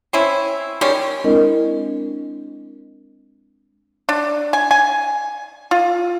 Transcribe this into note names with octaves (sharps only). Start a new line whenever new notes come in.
C4 C#4 E4
D#3 G3 G#3 C#4
G#3 C4 D4 E4 A#4 D#5
D4
G#5
G#5
F4